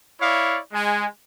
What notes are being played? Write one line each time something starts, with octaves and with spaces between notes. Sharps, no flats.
E4 C#5 D5 F5
G#3 G#5